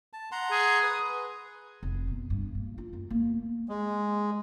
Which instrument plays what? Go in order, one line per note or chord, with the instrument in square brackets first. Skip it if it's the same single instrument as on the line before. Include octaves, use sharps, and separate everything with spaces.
[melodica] A5
F#5 A#5 C6
[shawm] G#4
[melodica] B4 D#6
[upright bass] F1
B2
G2
A#2
F4
F#2
A#3
[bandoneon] G#3